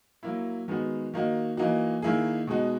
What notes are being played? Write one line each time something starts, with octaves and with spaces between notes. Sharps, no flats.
F#3 A#3 E4
D#3 G#3 B3 F#4
D#3 A#3 D#4 F#4
E3 A#3 D#4 F#4
D#3 A#3 E4 G#4
B2 G#3 D#4 F#4